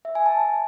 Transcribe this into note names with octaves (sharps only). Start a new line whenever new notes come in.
E5
G#5
A5